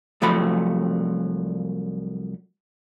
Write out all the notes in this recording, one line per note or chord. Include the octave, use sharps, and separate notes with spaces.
C2 F3 F#3 A3 B5